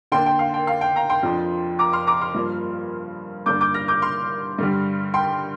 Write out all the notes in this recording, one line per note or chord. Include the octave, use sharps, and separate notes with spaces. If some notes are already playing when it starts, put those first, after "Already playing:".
D3 A#3 D4 G5 C6
G5
F5
G5
F5
G5
F5 A#5
G5 C6
F2 F3 D4
A#5 D6
C6 F6
A#5 D6
C6 F6
G2 F3 A#3
G2 D3 A#3 D4 D6 G6
D6 G6
F6 A#6
D6 G6
C6 F6
G2 D3 G3
G5 C6